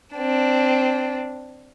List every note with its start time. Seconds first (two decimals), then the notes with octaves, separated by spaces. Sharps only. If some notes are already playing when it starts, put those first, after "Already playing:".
0.16 C4 D4